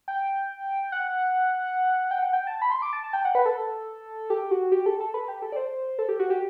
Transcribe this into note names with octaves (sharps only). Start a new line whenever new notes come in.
G5
F#5
G5
F#5
G5
A5
B5
C6
D6
A5
A5
G5
F#5
B4
A4
G4
F#4
G4
A4
A4
B4
G4
A4
D5
C5
A4
G4
F#4
G4